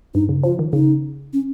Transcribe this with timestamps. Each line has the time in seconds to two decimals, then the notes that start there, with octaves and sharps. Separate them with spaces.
0.14 G2 D#4
0.29 C#3
0.43 F3 F4
0.59 D#3
0.73 C#3 D#4
1.33 C#4